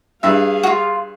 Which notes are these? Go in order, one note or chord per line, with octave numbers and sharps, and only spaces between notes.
G2 G#4 E5 F5
F4 F#4